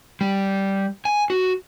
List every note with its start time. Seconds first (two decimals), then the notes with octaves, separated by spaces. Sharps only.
0.21 G3
1.05 G#5
1.30 F#4